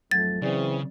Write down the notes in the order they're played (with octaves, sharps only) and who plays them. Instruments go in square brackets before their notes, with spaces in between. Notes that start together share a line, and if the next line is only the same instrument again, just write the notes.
[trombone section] G#1 F2 A3 [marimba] F#3 G#6 [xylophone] A6
[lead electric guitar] C#3 [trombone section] E3 C4 G#4 [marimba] D5